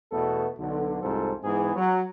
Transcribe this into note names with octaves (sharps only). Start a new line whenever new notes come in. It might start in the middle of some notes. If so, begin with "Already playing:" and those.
E2 B2 A3 B3 A4
B1 D3
C2 F2 G#2 F3 A4
G#2 E3 B3 G#4
F#3